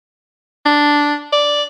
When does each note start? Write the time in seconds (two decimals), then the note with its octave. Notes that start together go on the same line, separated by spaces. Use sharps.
0.66 D4
1.32 D5